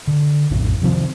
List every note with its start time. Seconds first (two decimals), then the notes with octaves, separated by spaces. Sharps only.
0.07 D3
0.51 A#1 F2 A2
0.82 C3 D#3 F3 C4